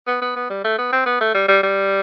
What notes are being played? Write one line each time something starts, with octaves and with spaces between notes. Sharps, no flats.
B3
B3
B3
G3
A3
B3
C4
B3
A3
G3
G3
G3